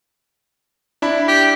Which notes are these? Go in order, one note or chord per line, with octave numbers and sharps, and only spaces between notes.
D4 E4 B5
G4